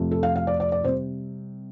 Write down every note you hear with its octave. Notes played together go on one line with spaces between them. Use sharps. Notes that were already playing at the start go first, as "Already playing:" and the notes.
Already playing: F2 C3 F3 A3
A4
F5
F5
D5
D5
D5
C3 G3 C5